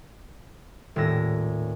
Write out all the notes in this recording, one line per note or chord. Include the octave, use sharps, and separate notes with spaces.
D#1 A2 E6 A#6